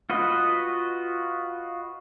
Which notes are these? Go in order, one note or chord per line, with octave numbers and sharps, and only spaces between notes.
F4 F#4 B4 D#5